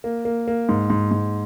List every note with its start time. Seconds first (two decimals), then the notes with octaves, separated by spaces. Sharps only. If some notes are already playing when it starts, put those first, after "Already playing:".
0.04 A#3
0.25 A#3
0.47 A#3
0.69 G#2
0.90 G#2
1.11 G#2